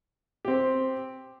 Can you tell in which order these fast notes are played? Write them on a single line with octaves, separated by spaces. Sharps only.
G4 C4 C5